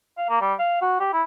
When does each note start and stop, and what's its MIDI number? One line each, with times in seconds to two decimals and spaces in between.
0.18 0.27 77
0.29 0.39 58
0.42 0.54 55
0.59 0.80 77
0.82 0.97 66
1.00 1.12 67
1.13 1.23 64